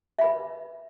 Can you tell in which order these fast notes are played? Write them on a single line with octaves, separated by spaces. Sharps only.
E5 B5 B4